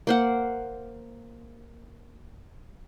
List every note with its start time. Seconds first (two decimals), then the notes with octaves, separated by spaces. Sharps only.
0.07 A#3 C5 F#5